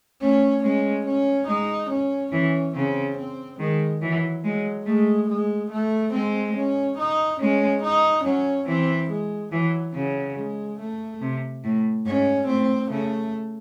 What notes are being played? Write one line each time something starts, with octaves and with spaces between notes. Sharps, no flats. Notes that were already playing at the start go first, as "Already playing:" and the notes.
A3 C#4
G#3 C#4
C#4
G#3 D#4
C#4
E3 C#4
C#3 C4
C4
D#3 G#3
E3 F#3
F#3 G#3
G#3 A3
G#3
A3
G#3 C4
C#4
D#4
G#3 C#4
D#4
F#3 C#4
E3 C4
G#3
E3 F#3
C#3 F#3
G#3
A3
C3
A2
G#2 C#4
A2 C4
C#3 A3